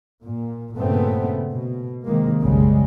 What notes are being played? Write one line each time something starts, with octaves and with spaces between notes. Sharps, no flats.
A#2
G2 A#2 C#3 A3 B3 C4
B2
C3 D#3 G#3 A#3
F#1 B1 C#3 G3 G#3